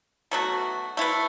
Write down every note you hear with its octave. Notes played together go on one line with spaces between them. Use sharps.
B2 F#3 A3 F#4
A3 E4 B4